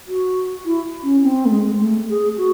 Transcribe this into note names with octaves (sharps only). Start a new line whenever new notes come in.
F#4
E4
C#4
C4
A3
G#3
A3
G#4
F#4